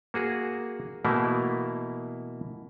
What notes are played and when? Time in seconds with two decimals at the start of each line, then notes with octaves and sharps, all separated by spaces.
0.14 A#3 F#4 G#4
1.05 B2 E3 A3 A#3 E4